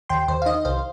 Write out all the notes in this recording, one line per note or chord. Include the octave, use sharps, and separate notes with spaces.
D#2 G5 C6
D#2 C5
F5
D#3 D#5
C2 C5 F5